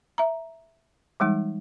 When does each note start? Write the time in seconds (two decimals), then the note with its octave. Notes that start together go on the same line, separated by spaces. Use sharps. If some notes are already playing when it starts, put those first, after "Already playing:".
0.18 E5 A#5
1.20 E3 G3 G#3 D#4